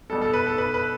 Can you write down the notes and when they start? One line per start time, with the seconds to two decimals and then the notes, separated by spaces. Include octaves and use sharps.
0.09 B2 G3 B3 A4
0.22 A4
0.33 B4
0.47 A4
0.58 B4
0.74 B4